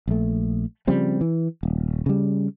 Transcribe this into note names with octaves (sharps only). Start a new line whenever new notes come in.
A#1 A3
C#3 F3 G3 C4
E3
D#1
C#3 G3